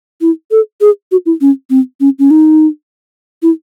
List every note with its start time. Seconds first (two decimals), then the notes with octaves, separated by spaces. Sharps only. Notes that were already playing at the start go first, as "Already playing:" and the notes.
0.21 E4
0.51 A4
0.81 G#4
1.12 F#4
1.26 E4
1.41 C#4
1.70 C4
2.00 C#4
2.19 C#4
2.31 D#4
3.42 E4